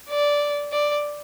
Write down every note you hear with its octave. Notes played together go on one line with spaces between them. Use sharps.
D5
D5